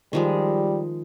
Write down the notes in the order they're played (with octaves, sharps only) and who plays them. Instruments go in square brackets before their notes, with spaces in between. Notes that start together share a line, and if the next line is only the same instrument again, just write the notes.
[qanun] D#3 F3 G#3 [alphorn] G3